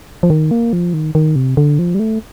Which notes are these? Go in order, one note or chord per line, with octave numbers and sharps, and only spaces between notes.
F3
D#3
A#3
F3
D#3
D#3
C3
D3
F3
G3
A3